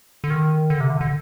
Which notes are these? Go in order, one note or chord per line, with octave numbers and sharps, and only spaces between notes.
D3
D#3
D3
C3
D3
D3